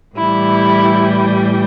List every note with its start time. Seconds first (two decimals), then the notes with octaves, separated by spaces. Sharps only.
0.16 A2 E3 G3 E4